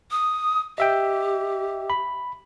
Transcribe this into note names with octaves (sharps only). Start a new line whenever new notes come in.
D#6
G4 D#5 E5 G5
B5